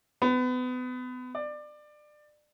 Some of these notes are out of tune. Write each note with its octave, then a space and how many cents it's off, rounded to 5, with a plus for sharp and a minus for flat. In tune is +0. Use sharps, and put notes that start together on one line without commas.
B3 +30
D5 +25